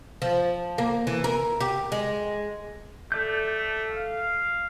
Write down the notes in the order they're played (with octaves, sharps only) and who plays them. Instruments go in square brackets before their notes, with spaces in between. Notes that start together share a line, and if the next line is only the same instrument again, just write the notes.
[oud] F3
A#3
E3
A#4
G4
G#3
[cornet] A3 [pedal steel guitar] A4 D5 G6
[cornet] F5